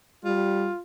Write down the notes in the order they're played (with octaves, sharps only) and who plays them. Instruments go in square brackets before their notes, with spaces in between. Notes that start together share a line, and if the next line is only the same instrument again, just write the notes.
[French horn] G3 [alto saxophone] F4